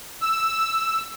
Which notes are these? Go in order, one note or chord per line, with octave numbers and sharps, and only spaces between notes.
E6